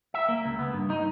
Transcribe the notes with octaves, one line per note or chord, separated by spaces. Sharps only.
E5
A#3
C#2
B3
G2
D#4